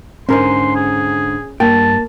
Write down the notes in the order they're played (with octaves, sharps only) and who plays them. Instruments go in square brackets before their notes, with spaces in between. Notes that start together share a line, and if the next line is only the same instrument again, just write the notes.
[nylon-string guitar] G#2 D3 D#4 [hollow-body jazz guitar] C#4 A#4 [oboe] C6
[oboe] G#4
[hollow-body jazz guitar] G2 G5 [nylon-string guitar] A#3 [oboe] A5